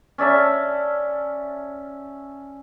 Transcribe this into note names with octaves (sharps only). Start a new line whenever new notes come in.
C#4 D5 E5 A5